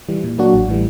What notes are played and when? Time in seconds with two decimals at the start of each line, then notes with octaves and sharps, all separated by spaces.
0.09 E3 G3
0.24 A#2
0.38 F#3 A#3 D4 F#4
0.54 A1
0.69 A2 E3 G3